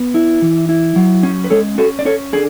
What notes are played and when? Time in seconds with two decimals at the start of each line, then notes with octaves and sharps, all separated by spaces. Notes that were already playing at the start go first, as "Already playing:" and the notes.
Already playing: B3
0.14 E4
0.42 E3
0.69 E4
0.96 F#3
1.23 C#4
1.44 B4
1.50 G#3 A4 C#5
1.78 C#4 F#4 A4
1.99 D5
2.05 C#4 A4 C#5
2.33 D3 G#4